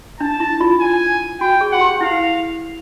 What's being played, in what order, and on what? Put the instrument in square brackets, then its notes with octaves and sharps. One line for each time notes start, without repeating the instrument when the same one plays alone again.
[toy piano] D4 [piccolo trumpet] A5
[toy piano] E4
F4
[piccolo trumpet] G#5
[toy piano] F#4 [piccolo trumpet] G5
[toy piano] G#4
[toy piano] F#4 [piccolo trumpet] F#5
[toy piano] G4
[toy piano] E4 [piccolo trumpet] F5